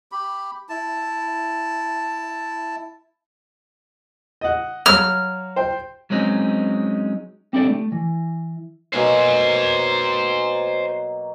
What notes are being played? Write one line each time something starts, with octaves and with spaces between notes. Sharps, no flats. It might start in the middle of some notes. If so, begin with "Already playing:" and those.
G4 B5
E4 A5
D#5 F#5
F#3 F5 E6 F6
C5 G5
F#3 G#3 C4 C#4 D#4
C4 D4 E4 G4 A4 D5
A3
E3
B2 F#3 A#3 C5 G#5